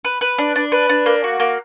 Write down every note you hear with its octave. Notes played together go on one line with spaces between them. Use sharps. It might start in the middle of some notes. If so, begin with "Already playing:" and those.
B4
B4
D4
D4
B4
D4
A#3
F#4
A#3